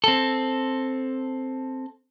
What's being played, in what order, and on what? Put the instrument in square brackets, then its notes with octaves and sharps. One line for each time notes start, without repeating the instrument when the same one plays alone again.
[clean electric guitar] C4 A4